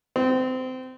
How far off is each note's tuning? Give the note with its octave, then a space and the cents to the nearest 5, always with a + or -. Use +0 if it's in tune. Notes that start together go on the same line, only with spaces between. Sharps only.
C4 -25